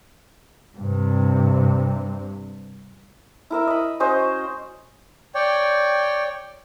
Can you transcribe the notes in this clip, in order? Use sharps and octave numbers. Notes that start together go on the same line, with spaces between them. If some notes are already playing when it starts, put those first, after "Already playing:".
G2 C3
E4 A#4 E5
D#5 B5
C#4 F#4 C5 D#5
C#5 D5 G5